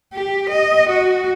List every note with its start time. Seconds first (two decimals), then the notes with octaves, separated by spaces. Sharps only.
0.13 G4
0.49 D#5
0.89 F#4